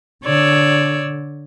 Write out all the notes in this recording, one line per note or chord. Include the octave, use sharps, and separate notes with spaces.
D3 C#5 D5 E6